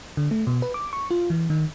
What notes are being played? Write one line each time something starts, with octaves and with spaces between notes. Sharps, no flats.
D3
A3
B2
B4
D6
C#6
F4
E3
D#3